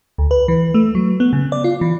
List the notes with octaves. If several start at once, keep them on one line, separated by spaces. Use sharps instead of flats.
D2
B4
E3
A3
F#3
B3
C#3
D5
F4
E3